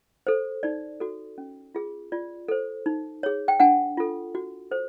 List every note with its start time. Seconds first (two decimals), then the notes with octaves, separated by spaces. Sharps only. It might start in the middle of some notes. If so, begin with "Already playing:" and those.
0.27 A4 C5
0.63 D#4 D5
1.00 F#4 A4
1.38 C#4
1.75 F4 G#4
2.12 F4 D5
2.48 A4 C5
2.86 D#4
3.23 G#4 C#5
3.48 G5
3.60 D4 F#5 G#5
3.97 F4 A4
4.35 F#4
4.71 A4 C5